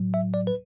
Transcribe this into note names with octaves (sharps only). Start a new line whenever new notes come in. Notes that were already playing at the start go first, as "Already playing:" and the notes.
Already playing: A2 F#3
E5
D5
B4